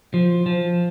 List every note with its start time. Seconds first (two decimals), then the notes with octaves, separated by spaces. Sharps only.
0.14 F3
0.46 F3